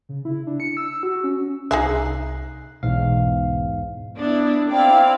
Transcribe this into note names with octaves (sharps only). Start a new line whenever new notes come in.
C#3
E4
D4
C#7
E6
E6
F#4
C#4
C2 D#4 G#4 E5 F#6 C7
B1 E2 G#2 B2 F5
B3 D4 E4
C4 E4 D5 F5